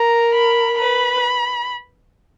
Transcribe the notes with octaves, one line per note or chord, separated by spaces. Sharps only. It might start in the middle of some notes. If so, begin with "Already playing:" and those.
Already playing: A#4 A#5
B5
B4 B5